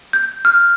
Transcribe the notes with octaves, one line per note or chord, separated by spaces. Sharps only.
G6
F6